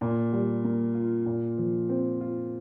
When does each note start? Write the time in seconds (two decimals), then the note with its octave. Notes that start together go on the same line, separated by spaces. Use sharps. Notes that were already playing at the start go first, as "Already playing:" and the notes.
0.01 A#2
0.33 G3
0.64 A#3
0.94 F4
1.26 A#2
1.58 F3
1.89 C4
2.21 F4